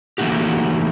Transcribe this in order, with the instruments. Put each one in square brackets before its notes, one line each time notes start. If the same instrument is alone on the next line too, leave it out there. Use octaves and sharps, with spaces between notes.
[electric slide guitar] E3 A3 A#3 D#4 F#4 G4